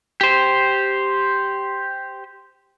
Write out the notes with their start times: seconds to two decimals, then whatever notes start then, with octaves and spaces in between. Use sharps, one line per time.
0.21 G4 C5